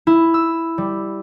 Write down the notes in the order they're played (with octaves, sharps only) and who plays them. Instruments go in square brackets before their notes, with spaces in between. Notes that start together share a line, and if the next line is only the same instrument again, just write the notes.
[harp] E4
E6
G3